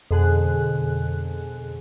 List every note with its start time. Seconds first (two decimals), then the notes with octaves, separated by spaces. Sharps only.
0.11 F2 B2 D3 G#4 G#5 F#6